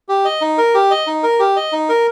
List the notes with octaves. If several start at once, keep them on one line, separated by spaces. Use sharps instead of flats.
G4
D#5
D#4
A#4
G4
D#5
D#4
A#4
G4
D#5
D#4
A#4